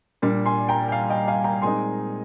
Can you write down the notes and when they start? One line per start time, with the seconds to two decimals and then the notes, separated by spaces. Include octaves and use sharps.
0.22 A#2 G3 D4
0.46 G#5 C6
0.69 G5 A#5
0.89 G5
0.92 F5 G#5
1.09 D#5 G5
1.28 F5 G#5
1.44 G5 A#5
1.62 A#2 G#3 C4 D#4 G#5 C6